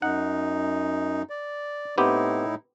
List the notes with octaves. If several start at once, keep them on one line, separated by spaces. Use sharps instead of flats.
F#2 D#4 F#5
D5
A2 B3 C4 D#4 E4 G4